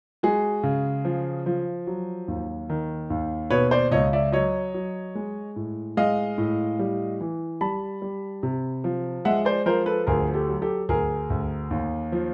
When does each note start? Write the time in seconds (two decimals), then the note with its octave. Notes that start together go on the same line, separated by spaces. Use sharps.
0.23 G#3 F#4 G#4
0.63 C#3
1.05 F3
1.46 F3
1.87 F#3
2.28 D#2
2.69 D#3
3.10 D#2
3.50 B2 B4 C#5
3.71 C5 D5
3.91 C#2 C#5 D#5
4.13 D5 E5
4.32 F#3 C#5 D#5
4.74 F#3
5.15 G#3
5.56 A2
5.97 G#3 D#5 F5
6.38 A2
6.79 G3
7.21 E3
7.61 G3 A5 B5
8.02 G3
8.43 C3
8.84 F3
9.25 G#3 E5 F#5
9.45 C5 D5
9.66 F3 A#4 C5
9.86 A4 B4
10.07 D2 G#4 A#4
10.34 G4 A4
10.48 F#3
10.62 G4 A4
10.89 D2 G#4 A#4
11.30 D2
11.71 D#2
12.12 F3